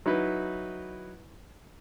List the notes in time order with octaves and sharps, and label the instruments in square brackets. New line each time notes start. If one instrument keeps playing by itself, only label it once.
[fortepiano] F#3 D#4 E4 B4